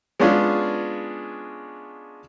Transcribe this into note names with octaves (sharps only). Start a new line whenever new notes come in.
G#3 B3 C#4 D4 F4 G#4